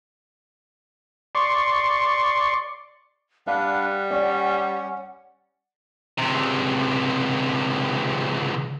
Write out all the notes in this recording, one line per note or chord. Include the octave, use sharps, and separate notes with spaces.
D5 C6 C#6
G3 D4 B4 F5 F#5
C#4 D5
C#2 C3